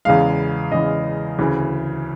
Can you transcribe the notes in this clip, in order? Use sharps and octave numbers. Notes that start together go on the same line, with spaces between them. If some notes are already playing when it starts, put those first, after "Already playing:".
E2 C#3 E3 G#3 F5
E2 C#3 E3 G#3 D#5
D2 C#3 E3